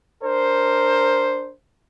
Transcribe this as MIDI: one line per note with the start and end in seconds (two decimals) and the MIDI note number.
0.23 1.51 62
0.23 1.51 70
0.23 1.51 72